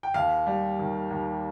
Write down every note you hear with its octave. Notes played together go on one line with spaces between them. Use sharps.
G5
D#2 F5
G3
D#3
D#2